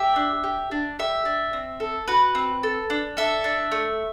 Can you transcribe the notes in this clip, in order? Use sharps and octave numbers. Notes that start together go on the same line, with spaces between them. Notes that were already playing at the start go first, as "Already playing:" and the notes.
Already playing: G4 E5
D4
G4
D4
G4 E5
D4
C4
A4
F#4 B4
C4
A4
D4
A4 E5
D4
A3